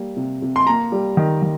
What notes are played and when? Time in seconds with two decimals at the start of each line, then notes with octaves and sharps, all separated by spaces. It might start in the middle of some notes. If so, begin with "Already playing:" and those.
Already playing: G3 A#3
0.17 C3
0.42 C3
0.56 C6
0.67 A#3 A#5
0.92 G3
1.17 D#3
1.42 D#3